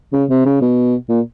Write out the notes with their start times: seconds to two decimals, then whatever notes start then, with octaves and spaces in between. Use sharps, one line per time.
0.13 C#3
0.30 C3
0.46 C#3
0.62 B2
1.09 A#2